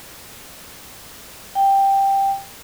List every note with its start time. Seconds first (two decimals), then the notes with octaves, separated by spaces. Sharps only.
1.55 G5